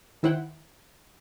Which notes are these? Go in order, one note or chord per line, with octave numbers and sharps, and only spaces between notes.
D#3 E4 C5 F#5 G5